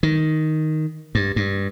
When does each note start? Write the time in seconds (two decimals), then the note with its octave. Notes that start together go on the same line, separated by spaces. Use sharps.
0.03 D#3
1.15 G2
1.36 G2